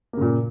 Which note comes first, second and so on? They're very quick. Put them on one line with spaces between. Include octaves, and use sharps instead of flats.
A#3 C#3 A#2